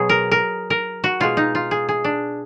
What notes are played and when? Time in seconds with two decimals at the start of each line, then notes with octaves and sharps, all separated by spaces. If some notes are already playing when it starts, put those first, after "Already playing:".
Already playing: B2 F#3 G#4
0.09 A#4
0.31 A#4
0.70 A#4
1.04 F#4
1.20 B2 G#3 F4
1.37 D#4
1.55 F4
1.71 G#4
1.89 G#4
2.04 D4